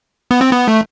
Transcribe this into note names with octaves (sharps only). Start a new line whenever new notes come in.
B3
C4
B3
A3